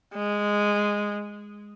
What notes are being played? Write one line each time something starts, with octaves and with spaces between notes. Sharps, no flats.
G#3